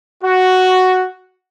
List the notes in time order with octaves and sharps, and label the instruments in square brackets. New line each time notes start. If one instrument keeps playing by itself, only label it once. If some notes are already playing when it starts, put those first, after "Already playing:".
[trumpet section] F#4